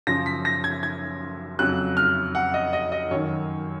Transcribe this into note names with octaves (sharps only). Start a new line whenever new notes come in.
F#2 C#3 F3 A#6
B6
A#6
G#6
G#6
F2 C#3 F#3 F#6
F6
F#5
D#5
D#5
D#5
F#2 D#3 F#3 C#5